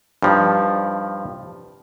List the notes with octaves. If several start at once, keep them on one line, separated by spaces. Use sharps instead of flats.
G2 F3 D#4